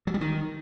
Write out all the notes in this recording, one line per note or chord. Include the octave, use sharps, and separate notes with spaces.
F#3
G3
D#3